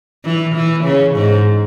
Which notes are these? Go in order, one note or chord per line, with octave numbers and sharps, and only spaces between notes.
E3
E3
C#3
G#2